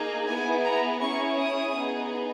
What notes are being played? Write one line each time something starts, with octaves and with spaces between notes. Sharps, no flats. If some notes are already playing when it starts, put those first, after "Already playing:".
Already playing: A#3 D#4 G#4
B3 E4 G#4 G#5
A#5
C#4 E4 G#4 C#6
D#6
B3 D#4 G#4